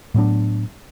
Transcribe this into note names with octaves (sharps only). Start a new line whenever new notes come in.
A2 F#3 B3 D4